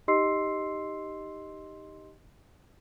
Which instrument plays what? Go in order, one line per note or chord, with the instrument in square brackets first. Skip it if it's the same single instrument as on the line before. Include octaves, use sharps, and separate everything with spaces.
[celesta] D#4 G4 D#5 C6 E6 C7